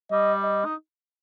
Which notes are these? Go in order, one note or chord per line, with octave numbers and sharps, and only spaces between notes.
G3 D#5
D#5
D#4